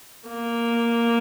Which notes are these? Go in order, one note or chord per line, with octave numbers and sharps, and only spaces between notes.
A#3